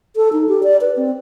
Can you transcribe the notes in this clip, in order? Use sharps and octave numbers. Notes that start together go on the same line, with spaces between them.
A4
D#4
G4
D5
B4
C4